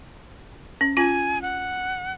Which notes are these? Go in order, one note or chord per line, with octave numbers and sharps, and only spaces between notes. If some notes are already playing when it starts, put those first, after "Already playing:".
C#4
C#4 F4 G#5
F#5